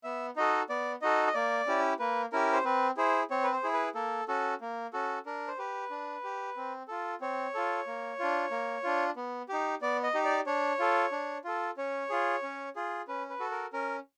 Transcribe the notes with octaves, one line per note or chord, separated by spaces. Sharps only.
B3 E5
D#4 F#4 A4 D#5
B3 D5
D#4 F#4 A4 D#5
D#5
A#3 D5
C#4 E4 G4
A#3 B4
C#4 E4 G4 A#4
C5
C4 B4
E4 G#4 C5
C4 C#5
B4
C5
E4 G#4
B4
A#3 A4
C#4 F#4 A4
A#3
C#4 F#4 A4
D4 A#4
C5
G4 B4
D4
G4
C4
F4 A4
C4 C#5
F4 A4
A#3
D4 F4
A#3
D4 F4
B3
D#4 G4
B3 D5
D#5
D#4 G4
D5
D4 C#5
F4 A4
D4
F4 A4
C#4 C#5
F4 G#4
C#4
F4 G#4
C#4 B4
B4
F#4 A4
A#4
C#4 A#4